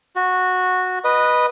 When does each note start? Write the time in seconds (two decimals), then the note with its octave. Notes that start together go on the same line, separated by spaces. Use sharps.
0.16 F#4
1.04 B4 D#5